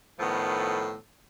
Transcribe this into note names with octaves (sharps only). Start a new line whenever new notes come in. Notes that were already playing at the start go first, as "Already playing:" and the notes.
A2 D#3 F3 B3 A4